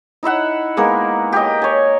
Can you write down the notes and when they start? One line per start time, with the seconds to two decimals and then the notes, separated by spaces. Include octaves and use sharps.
0.23 D#4 E4 E5 F#5
0.77 G#3 A#3 B3 A#4
1.33 G4 A#4 D#5
1.62 C#5 G#5